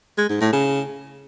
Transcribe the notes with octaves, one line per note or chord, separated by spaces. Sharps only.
G#3
G#2
A2
C#3